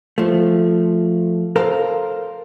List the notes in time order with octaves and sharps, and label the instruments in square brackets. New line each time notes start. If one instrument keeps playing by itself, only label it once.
[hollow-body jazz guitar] F3 A3
A4 A#4 C5 F5 A#5